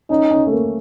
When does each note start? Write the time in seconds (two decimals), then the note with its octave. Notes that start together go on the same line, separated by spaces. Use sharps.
0.10 C#4 D#4
0.31 C#4
0.47 A3
0.51 A#3